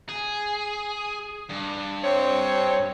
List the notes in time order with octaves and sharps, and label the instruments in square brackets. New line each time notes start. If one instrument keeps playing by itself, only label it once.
[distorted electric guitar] G#4
G2
[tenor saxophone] C4 [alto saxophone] C#5